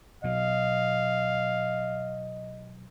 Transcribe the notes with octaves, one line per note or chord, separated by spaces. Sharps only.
B2 F#3 D#5 F5